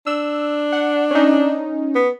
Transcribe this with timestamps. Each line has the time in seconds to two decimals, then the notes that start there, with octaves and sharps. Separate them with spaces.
0.07 D4 E6
0.73 F#5
1.11 C#4 D#4
1.95 B3